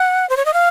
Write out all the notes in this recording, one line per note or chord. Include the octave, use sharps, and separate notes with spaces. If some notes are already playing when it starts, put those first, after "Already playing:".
Already playing: F#5
C5
C#5
D#5
F5